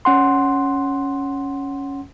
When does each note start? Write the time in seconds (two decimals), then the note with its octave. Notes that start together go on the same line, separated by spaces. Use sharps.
0.05 C#4 F#5 C6